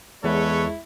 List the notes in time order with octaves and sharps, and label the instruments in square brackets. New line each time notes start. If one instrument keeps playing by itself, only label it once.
[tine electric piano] E2 [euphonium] G#3 [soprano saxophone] E4 [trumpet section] A4 B4 C#5